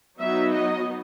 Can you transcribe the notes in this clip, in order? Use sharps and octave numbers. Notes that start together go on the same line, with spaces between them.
F#3 B3 D#4 E5
D#5